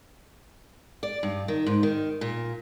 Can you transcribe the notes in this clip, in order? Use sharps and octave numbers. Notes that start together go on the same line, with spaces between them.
D5
G2
D#3
G#2
D#3
A#2